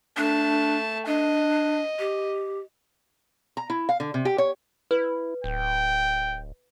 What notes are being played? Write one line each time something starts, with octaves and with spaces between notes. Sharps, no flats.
A3 D4 A5
D4 D#5
G4
A#5
E4
F5
D3
C3
G4
C#5
E4 B4
D1 G5